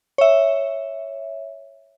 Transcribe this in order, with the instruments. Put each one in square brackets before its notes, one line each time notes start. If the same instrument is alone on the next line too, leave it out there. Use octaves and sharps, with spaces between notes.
[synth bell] C#5 E5